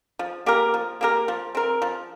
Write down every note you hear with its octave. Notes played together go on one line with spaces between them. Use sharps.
F3
A#3 G4 A#4
F3
A#3 G4 A#4
F3
C4 A#4
F3